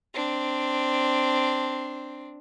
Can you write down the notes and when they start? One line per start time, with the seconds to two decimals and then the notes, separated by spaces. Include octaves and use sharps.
0.14 C4 D4